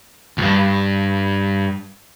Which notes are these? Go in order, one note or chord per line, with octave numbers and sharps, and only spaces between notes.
D2 G2